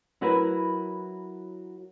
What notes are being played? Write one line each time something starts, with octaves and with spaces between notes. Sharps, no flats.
F#3 E4 F#4 A#4 B4